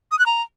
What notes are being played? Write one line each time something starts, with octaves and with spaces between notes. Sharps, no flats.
D#6
F#6
A#5